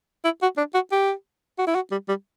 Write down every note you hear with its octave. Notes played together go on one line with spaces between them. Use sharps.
E4
F#4
D4
F#4
G4
F#4
E4
F#4
G3
G3